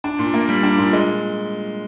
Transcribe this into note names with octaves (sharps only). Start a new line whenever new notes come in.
D4
A#2
A#3
G3
D4
A#2
G#3